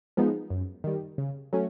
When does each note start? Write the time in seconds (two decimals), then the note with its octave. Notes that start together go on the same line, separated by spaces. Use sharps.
0.17 F3 G#3 B3 D#4
0.50 F#2
0.84 D#3 G3
1.18 C#3
1.53 F#3 A3 C#4